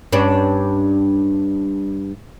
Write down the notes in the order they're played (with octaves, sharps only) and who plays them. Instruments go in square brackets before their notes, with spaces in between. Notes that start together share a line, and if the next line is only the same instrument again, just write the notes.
[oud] G2 C#4 D4